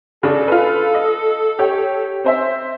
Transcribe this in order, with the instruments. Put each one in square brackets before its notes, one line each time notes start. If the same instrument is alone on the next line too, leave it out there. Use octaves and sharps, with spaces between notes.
[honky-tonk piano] C#3 D4 [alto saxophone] A4
[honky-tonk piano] F4 B4
D#5
G4 C#5
C4 C5 E5